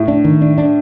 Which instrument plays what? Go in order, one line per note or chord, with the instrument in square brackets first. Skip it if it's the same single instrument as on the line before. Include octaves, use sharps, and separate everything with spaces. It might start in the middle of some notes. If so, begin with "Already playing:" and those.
Already playing: [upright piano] A2
[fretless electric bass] D4
D#3
D4
D4